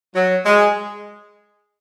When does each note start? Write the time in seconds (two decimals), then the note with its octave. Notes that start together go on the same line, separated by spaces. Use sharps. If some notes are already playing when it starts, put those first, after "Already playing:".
0.15 F#3
0.46 G#3